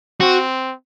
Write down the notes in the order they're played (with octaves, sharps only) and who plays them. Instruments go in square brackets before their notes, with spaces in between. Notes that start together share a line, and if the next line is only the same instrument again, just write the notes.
[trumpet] C4 [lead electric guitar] F#4